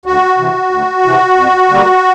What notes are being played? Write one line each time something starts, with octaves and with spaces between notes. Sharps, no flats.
D2 F#4
C3 E3
D2
C3 E3
F2
D3 G3 A#3